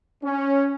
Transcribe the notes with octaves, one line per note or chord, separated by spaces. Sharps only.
C#4